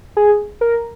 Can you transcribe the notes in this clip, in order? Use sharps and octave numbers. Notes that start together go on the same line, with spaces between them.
G#4
A#4